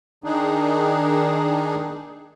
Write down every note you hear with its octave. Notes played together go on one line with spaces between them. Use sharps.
D#3 D4 D#4 G#4